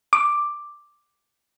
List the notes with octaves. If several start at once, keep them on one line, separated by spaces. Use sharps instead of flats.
D6